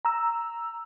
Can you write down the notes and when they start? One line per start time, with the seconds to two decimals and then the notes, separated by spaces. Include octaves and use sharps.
0.05 A#5 E6